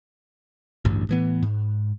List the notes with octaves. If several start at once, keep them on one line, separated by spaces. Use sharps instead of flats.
A1 D2 G2
A2 E3 B3
G#2